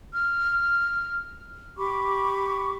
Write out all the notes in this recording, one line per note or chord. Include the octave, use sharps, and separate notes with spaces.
F6
G4 B5 C#6 D6